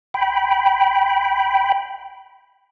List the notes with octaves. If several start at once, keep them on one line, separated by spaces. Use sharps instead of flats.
G5 B5